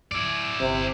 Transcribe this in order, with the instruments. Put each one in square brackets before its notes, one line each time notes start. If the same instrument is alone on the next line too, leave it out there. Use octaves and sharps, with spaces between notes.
[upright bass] G#2 F#3 [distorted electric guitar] E4 D5
[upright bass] G1 [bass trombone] C3